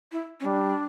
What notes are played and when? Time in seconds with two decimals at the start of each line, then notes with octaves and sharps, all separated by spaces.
0.12 E4
0.40 C#4
0.45 G3 D4